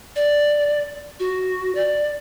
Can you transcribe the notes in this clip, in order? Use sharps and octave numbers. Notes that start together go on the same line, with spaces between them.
D5
F#4
D5